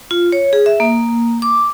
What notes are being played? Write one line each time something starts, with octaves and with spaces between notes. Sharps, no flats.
F4
C#5
G#4
E5
A#3
D6